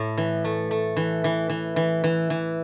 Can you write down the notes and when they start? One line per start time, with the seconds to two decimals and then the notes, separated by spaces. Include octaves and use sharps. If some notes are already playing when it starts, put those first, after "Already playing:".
Already playing: A2 A3
0.18 E3
0.44 A3
0.71 A3
0.97 E3
1.24 E3
1.50 E3
1.76 E3
2.04 E3
2.30 E3